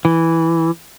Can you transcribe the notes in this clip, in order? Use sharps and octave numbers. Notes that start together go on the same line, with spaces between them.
E3